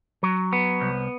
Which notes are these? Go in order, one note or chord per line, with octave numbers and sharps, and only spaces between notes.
F#3
B3
C2